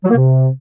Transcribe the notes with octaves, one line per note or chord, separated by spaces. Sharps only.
F#3
A#3
C3